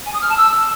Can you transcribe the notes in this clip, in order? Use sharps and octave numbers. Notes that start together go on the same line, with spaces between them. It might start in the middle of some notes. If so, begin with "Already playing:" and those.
G#5
D#6
F6
A5
E6